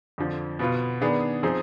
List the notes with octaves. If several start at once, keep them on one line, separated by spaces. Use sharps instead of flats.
F2 D3 F3
B2 B3 F4
D#3 B3 D4 G#4
F3 C4 D#4 G#4